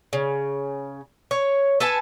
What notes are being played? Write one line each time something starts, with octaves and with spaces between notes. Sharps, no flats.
C#3
C#5
A4 B4 G#5 A5